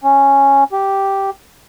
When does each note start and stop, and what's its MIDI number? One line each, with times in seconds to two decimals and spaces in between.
0.04 0.64 61
0.72 1.30 67